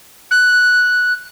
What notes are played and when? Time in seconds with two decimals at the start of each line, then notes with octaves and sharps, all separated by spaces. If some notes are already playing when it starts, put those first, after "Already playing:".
0.31 F#6